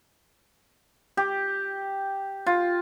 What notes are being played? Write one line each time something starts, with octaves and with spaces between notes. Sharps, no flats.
G4
F4